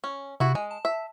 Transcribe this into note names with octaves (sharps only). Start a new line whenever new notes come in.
C#4
C3 E4 F#4
G#3 G#5
A5
E5